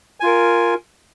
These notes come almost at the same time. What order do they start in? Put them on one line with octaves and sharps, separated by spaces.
G#5 F4 A#4